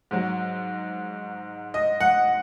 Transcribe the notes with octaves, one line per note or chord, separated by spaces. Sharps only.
G#2 F#3
D#5
F#5